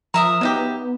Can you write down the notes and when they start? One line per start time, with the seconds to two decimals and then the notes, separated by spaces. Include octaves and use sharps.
0.14 F3 A#4 E5 A#5 D#6
0.41 F#3 B3 D#4 G4